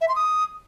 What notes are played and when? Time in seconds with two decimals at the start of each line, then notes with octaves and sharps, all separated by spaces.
0.01 E5
0.08 C6
0.16 D#6